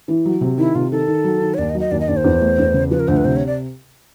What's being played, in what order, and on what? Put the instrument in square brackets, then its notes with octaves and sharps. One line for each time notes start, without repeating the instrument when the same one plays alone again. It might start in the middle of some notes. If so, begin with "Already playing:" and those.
[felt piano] E3
F#3
C3
[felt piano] D#3 [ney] E4
[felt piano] C3 [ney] F4
[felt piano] D#3 [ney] A4
[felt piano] D#3
F#3
D#3
[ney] C#5
[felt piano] D#2 [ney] D5
[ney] D#5
[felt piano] F#3
[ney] D#5
[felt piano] D#2 [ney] D5
[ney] D#5
[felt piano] D#2 [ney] D5
[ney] C5
[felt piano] E2
A3
E2
C#3
[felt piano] F3 [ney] B4
[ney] A#4
[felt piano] D2 [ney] C5
[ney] B4
[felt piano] C3 [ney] C5
[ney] C#5
D5